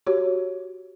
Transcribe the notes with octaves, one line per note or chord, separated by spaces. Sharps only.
F#4 G4 C#5